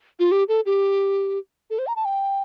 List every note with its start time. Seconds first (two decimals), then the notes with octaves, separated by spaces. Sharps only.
0.19 F4
0.31 G4
0.48 A4
0.66 G4
1.70 A4
1.79 C5
1.87 A#5
1.96 A5
2.05 G5